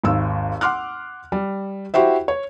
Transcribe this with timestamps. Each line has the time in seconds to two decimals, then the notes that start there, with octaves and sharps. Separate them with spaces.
0.04 G#1 D#2 E6
0.61 F#5 C6 D6 F6 F#6
1.32 G3
1.94 E4 F#4 G4 C5 E5
2.28 C#5